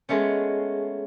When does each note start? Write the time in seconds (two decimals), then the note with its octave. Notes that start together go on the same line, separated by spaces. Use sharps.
0.09 G#3 A3 B3 C#4